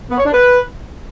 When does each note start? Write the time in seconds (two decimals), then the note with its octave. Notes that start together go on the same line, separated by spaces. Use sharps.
0.10 B3
0.18 C#5
0.25 D4
0.33 B4